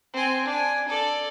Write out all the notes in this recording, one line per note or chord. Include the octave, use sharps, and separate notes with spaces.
C4 G#5
D4 G#5
A4 D5